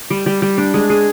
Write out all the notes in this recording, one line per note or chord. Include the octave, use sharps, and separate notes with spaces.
G3
G3
G3
D4
G#3
G#4